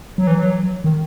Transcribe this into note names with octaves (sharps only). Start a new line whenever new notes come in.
F#3
E3
F#3
D#3